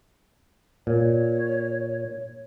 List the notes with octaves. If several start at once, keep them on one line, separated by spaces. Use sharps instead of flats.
A#2 C#5